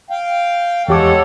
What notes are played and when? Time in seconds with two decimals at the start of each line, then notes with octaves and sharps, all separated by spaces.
0.10 F5 G5
0.88 E2 G#3 G4 A4 C#5 F#5 D6